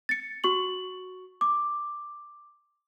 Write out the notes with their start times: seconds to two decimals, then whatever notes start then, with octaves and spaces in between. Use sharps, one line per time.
0.09 A6 C#7
0.44 F#4 C#6 F#7
1.41 D6